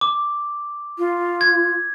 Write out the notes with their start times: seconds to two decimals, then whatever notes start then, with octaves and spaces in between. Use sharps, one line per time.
0.01 D6
0.98 F4
1.41 G#6